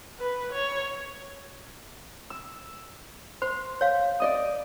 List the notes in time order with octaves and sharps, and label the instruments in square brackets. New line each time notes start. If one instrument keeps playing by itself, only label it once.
[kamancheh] B4
C#5
[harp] E6
[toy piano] C5 [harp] C6
[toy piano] C#5 F5
[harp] D5 D#5 D#6